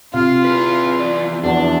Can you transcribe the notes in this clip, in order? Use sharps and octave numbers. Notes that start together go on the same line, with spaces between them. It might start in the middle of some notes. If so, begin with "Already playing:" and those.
C3 C4 F4 F5
E4 G#4 B4
E2 D5
E2 F3 D4 F#4